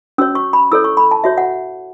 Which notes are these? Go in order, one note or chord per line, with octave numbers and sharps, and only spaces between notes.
C#4 F#4 C#5 E6
C#6
B5
E4 A4 C#5 E6
C#6
B5
A5
F#4 C#5 E5
F#5